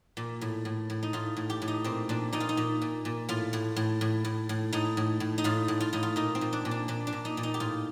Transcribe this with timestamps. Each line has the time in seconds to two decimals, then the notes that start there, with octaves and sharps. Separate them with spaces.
0.17 A#2
0.41 A2
0.65 A2
0.90 A2
1.03 D#4
1.13 A2 F4
1.37 A2
1.50 G4
1.62 A2
1.68 D#4
1.84 A#2 C4
2.09 A#2 D4
2.33 A#2 D#4
2.40 F4
2.49 D#4
2.57 A#2
2.82 A#2
3.05 A#2
3.29 A2 F4
3.53 A2
3.76 A2
4.01 A2
4.25 A2
4.49 A2
4.73 A2 D#4
4.97 A2
5.20 A2
5.38 D#4
5.44 A2 F4
5.68 A2
5.80 F4
5.93 A2 D#4
6.03 F4
6.16 A#2 D#4
6.35 C4
6.41 A#2
6.53 D4
6.65 A#2
6.71 D4
6.88 A#2 D4
7.07 D4
7.13 A#2
7.25 D#4
7.37 A#2
7.43 D#4
7.54 G4
7.60 A2 F4